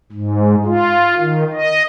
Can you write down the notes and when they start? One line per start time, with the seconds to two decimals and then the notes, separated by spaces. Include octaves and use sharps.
0.12 G#2
0.65 F4
1.18 D#3
1.53 D#5